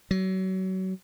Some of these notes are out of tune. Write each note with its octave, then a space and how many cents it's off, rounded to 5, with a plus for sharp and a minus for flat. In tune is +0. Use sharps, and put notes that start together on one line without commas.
F#3 +30